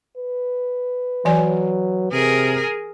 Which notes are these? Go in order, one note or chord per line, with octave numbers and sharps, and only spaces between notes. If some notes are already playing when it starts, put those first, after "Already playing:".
B4
E3 F#3 D5 G#5
C3 G#4 A#4